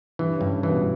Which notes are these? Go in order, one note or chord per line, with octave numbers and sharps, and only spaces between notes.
G2 E3 G3
G2 C#3 C#4
B2 E3 B3